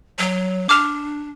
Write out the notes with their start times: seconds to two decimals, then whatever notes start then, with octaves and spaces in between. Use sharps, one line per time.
0.19 F#3
0.69 D4 D6 F6 F7